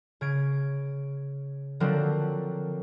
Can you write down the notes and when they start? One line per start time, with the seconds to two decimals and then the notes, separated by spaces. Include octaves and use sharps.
0.21 C#3 G#6 D7
1.80 D3 F3 F#3 A#3 C4 D4